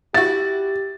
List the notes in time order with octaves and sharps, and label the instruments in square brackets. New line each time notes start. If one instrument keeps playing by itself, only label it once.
[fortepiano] E4 F#4 [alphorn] G4 [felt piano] A6